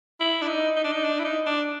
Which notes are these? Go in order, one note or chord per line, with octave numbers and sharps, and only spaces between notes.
E4
D4
D#4
D#4
D4
D#4
D4
E4
D#4
D4